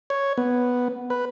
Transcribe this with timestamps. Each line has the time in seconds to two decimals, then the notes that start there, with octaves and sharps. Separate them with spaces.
0.10 C#5
0.38 B3
1.10 B4